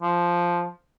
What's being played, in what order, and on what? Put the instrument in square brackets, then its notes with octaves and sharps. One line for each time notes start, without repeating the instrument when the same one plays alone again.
[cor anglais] F3